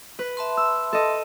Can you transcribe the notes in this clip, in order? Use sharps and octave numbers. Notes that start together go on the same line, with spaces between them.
B4
E5 A5 C6
E6
A4 D#5